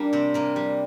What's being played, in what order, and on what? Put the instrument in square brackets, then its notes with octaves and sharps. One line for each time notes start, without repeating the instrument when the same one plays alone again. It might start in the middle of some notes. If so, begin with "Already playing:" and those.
Already playing: [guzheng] G3 A#3 D4 G4
C3 C4
C3 A#3
G3